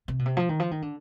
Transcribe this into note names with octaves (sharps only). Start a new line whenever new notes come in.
C3
B2
C3
F3
D#3
F3
D#3
D3